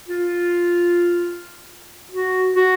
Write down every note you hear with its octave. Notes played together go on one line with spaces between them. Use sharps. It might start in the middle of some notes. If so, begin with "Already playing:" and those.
F4
F#4
F#4